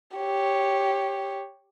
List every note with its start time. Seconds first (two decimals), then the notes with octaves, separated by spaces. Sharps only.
0.17 G4 C#5